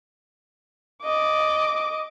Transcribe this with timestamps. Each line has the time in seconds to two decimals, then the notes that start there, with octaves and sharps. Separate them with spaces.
1.03 D#5 D6